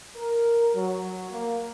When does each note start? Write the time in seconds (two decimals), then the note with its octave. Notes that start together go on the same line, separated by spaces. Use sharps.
0.17 A#4
0.75 F#3
1.31 A#3